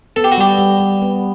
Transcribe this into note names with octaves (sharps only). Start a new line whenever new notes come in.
B3 A4
G4
F#4
G3 G4
G3
G3
B3